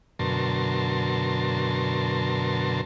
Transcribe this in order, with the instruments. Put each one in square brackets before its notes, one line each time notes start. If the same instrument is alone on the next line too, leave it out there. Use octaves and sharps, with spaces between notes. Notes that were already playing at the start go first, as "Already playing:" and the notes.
[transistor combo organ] F#2 B2 D3 A#4 A5 C6